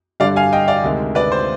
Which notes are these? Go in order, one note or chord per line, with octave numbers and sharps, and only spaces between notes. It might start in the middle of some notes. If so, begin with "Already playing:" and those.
G2 D3 G3 D5 F5
F5 G#5
D#5 G5
D5 F5
D2 C3 D#3 G#3
B4 D5
C5